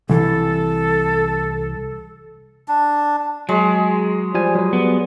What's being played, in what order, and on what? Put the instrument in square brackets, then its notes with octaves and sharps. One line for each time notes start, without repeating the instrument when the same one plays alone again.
[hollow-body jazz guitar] C2 E3 [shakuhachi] A4
[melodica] D4
[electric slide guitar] F#3 [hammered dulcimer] G#3
[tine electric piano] F3 G3 G#5
F#3 G3
[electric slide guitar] B3